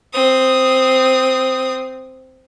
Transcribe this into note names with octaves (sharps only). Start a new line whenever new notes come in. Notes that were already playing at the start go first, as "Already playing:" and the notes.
C4 D#6